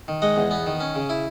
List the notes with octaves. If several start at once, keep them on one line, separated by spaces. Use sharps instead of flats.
D#3
G#3 D#5 F#5
E2
B3
D#3
C#4
C#3
E4